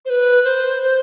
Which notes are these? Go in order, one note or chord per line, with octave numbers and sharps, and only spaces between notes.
C5
B4
C5
C5